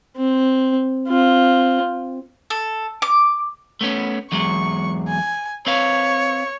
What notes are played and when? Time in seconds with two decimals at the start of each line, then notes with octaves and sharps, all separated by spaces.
0.17 C4
1.08 C4 F4
2.50 A4
3.02 D6
3.81 A3 B3 C#4
4.32 E2 F#3 G#3 C#6
5.08 G#5
5.66 C4 B4 C#5 F5